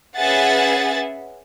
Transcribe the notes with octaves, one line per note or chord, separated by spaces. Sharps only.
C#4 G#4 B4 E5 F#5 A6